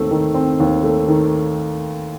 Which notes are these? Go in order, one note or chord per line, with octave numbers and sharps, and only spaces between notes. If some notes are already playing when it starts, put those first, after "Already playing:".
Already playing: D#2 A3 C4
D#3
C4
D#2
A3
D#3